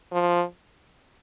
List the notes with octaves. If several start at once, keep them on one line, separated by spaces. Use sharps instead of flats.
F3